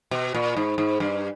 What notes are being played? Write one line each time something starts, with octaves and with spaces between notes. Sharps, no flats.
B2
A#2
G#2
G#2
G2